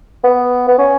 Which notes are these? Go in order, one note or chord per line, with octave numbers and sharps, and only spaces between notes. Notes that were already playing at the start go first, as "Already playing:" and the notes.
B3
B3
C#4